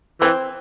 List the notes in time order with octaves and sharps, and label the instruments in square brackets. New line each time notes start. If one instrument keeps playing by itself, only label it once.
[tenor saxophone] E3 [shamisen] C4